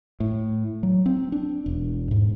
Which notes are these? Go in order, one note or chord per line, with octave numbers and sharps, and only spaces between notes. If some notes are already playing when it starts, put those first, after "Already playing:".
A2
F#3
C4
D4
E1
G#2